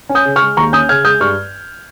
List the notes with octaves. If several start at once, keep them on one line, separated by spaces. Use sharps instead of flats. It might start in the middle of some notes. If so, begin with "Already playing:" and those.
C#4
D#6 G6
C#3
C#6 F6
G#3
D#2 A#5 C#6
C#4 D#6 G6
C#3 F6 G#6
G#3 D#6 G6
G2 C#6 F6